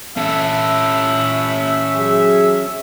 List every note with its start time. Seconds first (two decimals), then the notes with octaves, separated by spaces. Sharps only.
0.17 C#4 A4 E5
1.95 F#3 G#4